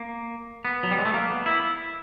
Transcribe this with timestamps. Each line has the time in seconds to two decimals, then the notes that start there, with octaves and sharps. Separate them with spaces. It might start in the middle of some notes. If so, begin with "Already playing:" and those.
Already playing: A#3
0.65 B3
0.83 F#3
0.91 G3
0.98 G#3
1.05 A3
1.14 A#3
1.31 B3
1.46 E4